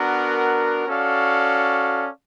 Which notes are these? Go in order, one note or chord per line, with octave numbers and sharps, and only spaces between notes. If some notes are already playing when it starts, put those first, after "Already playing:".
Already playing: B3 D4 F#4 A#4
C#4 F#4 A4 D5 F5